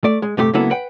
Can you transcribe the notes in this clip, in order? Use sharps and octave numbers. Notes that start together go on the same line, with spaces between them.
A3 D5
G#3
G2 C3 A3 G4
C#2 F#3 A#3 B3 E4 A4
B4 F#5 G5